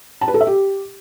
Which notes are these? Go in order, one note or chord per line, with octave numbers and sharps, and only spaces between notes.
A5
B4
A4
E5
G4